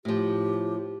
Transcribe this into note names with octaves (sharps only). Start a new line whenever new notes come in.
A2 F3 G4